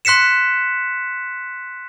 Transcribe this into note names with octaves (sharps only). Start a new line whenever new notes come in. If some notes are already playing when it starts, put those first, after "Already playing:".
C6 F#6 B6 C#7 E7